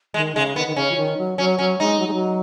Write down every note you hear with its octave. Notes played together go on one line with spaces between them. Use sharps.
D#3 G#3
C#3 G#3
D#3 B3
D#3
C#3 C#4
F3
D#3
F#3
F#3 C#4
F#3 C#4
G#3 D#4
F#3
G#3
F#3